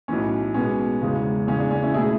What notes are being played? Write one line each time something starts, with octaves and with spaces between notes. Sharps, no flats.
B1 A2 E3 C#4
B1 B2 G#3 B3 C#4
E1 E2 C#3 G#3
E2 C#3 G#3 C#4
D4
C#4
C#4 E4
B2 A3 E4 G#4